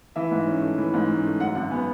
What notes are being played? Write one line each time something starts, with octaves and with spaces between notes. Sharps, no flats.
E3 E5
G#2
C#4
A3
E3
G#2
C#4
A3
F#2 F#5
G#1 F#5
B3 G#5